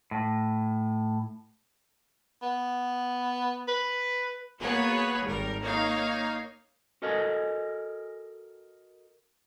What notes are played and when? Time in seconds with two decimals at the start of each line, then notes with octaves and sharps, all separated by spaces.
0.11 A2
2.42 B3
3.68 B4
4.60 A#3 B3 F#4 G#4 B4 C#5
5.26 G#1 G3 A#4
5.60 A#3 D#4 C#5 F5
7.02 F#4 A4 A#4 D#5 G#5